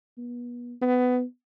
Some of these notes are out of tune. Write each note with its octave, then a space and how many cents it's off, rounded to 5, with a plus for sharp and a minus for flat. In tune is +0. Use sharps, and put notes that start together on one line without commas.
B3 -30
B3 +20